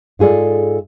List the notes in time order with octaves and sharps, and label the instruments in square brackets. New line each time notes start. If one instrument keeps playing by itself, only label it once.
[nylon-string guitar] G#2 F4 G#4 A4 D5